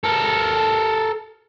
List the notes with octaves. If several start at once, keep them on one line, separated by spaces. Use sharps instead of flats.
A4 A#4